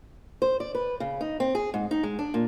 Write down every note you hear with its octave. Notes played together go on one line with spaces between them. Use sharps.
C5
D5
B4
C#3
D#4
C4
G#4
G#2
D#4
G#3
D4
A#2